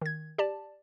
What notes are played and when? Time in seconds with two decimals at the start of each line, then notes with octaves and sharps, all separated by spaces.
0.01 D#3 G#6
0.38 G4 D5 A5